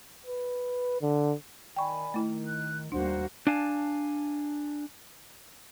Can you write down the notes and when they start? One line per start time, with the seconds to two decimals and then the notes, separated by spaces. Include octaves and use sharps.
0.26 B4
1.02 D3
1.76 D#3 D5 G5 G#5 B5 C#6
2.14 A3 E4
2.45 F#6
2.92 D#2 G3 A#3 D4 F#4 C5 F#5
3.47 D4 F5 G#5 A5